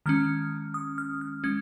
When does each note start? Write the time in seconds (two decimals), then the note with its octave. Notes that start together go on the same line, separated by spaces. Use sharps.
0.06 D#3 G#3 C#4 F6
0.74 D#6
0.98 F6
1.21 F6
1.44 G#3 C#4 G#6